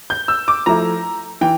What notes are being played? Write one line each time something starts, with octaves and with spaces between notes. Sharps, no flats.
G6
E6
D6
F3 A3 E4 A#5
E3 G5